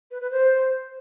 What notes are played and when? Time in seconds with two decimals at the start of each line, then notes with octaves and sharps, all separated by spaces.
0.11 B4
0.21 B4
0.31 C5